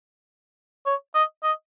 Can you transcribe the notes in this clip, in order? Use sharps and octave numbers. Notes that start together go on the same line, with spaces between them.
C#5
D#5
D#5